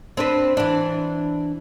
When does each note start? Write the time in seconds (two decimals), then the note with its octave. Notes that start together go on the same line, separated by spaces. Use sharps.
0.17 C4 D4 B4
0.57 E3 D4